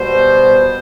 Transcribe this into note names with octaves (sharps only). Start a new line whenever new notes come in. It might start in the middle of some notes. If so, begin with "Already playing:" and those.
Already playing: B2 G3 B3 C5